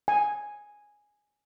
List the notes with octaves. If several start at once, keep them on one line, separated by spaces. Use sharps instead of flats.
G#5